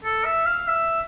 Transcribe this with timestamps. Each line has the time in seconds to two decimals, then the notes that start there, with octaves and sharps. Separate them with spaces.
0.04 A4
0.25 E5
0.46 F5
0.67 E5